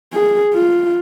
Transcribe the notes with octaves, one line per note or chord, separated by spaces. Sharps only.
G#4
F4